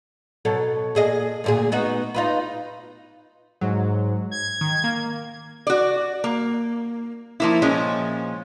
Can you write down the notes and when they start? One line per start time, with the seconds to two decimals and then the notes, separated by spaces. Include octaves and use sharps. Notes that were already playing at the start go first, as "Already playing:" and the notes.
0.45 B2 F#3 A4
0.95 A#2 G#4 D#5
1.44 D2 A#2 G#4
1.72 B3 D#4 F#4
2.14 D#4 F4 B4
3.61 G#2 F#3
4.31 G#6
4.61 D#3
4.84 A#3
5.67 F#4 D5
6.24 A#3
7.40 F3 A#3 E4
7.62 A#2 F3 G#3 C#4